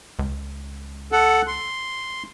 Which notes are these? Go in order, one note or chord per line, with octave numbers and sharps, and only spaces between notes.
C#2
A4 F#5
C6